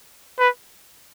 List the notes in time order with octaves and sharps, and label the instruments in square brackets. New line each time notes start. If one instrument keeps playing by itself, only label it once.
[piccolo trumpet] B4